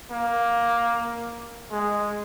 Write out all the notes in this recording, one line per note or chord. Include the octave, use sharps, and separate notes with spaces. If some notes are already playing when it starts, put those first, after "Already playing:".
A#3
G#3